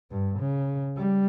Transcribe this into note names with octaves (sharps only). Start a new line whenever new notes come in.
G2
C#3
G3